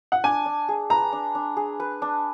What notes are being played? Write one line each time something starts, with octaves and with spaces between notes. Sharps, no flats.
F#5
D4 G#5
D4
G#4
B4 A#5
D4
D4
G#4
B4
D4